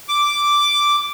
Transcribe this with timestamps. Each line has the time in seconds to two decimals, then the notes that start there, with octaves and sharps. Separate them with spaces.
0.09 D6